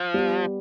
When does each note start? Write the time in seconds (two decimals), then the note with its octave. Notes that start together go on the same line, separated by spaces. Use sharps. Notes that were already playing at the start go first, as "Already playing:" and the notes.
Already playing: F3
0.14 G3 B3